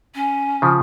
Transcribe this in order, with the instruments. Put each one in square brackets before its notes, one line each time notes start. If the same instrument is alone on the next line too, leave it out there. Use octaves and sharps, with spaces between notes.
[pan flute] C#4
[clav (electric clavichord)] C#3 F3